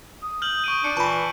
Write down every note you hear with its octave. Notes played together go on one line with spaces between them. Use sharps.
D#6
F6 G6 F#7
C#6 D7 D#7
D4 C#7
A#2 E3 A5 B5 C#6